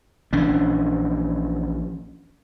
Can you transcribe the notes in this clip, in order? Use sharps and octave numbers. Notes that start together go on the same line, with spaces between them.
A#1 E3 C#4 D4